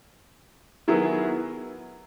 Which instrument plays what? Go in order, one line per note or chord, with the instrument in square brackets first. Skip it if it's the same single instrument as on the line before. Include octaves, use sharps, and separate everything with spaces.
[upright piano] D#3 F#3 B3 E4 G#4